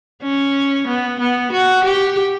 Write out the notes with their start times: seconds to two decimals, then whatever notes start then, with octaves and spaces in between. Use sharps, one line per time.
0.23 C#4
0.87 B3
1.19 B3
1.52 F#4
1.84 G4